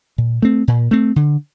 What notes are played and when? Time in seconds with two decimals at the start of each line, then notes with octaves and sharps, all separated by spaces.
0.18 A#2
0.42 A3 C4
0.68 A#2
0.91 A3 C4
1.16 D3